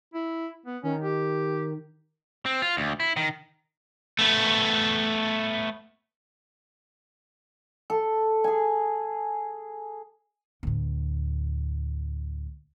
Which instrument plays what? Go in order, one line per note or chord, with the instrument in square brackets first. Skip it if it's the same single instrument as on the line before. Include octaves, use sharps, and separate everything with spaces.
[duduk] E4
B3
[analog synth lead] D#3 [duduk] C#4
[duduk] G4
[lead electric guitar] C4
F4
D2
E4
D#3
[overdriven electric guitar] A3 B3
[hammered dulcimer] A4
G#4 G#5
[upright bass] D2 A2